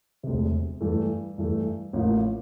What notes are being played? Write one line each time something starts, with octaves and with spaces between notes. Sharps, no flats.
E1 D2 C3
G2 E3 A3
G2 E3 A3
A1 A2 F3 A#3